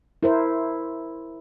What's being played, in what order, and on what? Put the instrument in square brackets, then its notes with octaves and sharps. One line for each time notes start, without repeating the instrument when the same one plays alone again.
[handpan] E4 A#4 C5